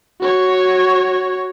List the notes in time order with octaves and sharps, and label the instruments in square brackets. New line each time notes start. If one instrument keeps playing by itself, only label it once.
[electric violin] F#4 C#5